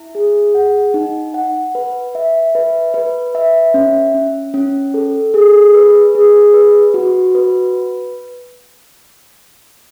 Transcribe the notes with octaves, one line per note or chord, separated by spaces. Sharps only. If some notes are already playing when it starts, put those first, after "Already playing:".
Already playing: E4
G#4
F#5
D#4
F#5
B4
E5
B4
B4
E5
C#4
C#4
C#4
A4
G#4
B4
G#4
B4
F#4
B4